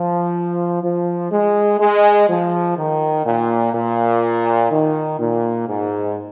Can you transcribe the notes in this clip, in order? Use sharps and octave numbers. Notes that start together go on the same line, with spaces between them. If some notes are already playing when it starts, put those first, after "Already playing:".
Already playing: F3
F3
G#3
G#3
F3
D#3
A#2
A#2
D#3
A#2
G#2